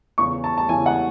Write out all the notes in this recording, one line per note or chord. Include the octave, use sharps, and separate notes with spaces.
E2 C#3 E3 C#6
A5
A5
E2 C#3 E3 G#5
F#5